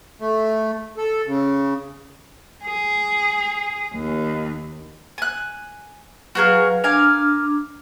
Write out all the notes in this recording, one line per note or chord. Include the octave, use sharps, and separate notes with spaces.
A3
A4
C#3
G#4
D#2
G#5 F#6
F#3 F#4 G#4 A#4 B4 F5
D4 A#4 F5 G#5 D6